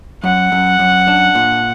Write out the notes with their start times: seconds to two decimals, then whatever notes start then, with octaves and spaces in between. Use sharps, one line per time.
0.24 F#2 F#5
0.52 F#2
0.79 F#2
1.08 D4
1.35 A#2